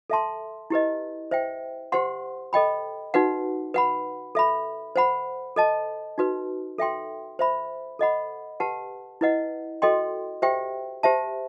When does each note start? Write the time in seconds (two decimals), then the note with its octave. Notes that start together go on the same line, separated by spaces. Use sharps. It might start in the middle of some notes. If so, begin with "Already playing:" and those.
0.10 A4 E5 A5 C6
0.70 E4 G4 B4 D#5
1.31 C5 E5 G5
1.92 G4 C5 F#5 C6
2.53 A4 D#5 G5 B5
3.14 D#4 F#4 B4 F#5
3.74 B4 F#5 B5
4.35 A4 E5 B5
4.96 C5 F#5 B5
5.56 A4 D#5 A5
6.18 D#4 F#4 B4
6.78 A4 E5 G5 C6
7.39 C5 E5 B5
7.99 A4 D#5 F#5 B5
8.60 G4 B4 F#5 A5
9.21 E4 B4 D#5 F#5
9.82 F#4 A4 D#5 G5 C6
10.42 G4 C5 E5 G5
11.03 G4 C5 E5 A5